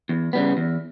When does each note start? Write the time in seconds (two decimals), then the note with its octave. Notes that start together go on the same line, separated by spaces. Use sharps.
0.09 E2
0.33 C#3 G3 B3
0.57 E2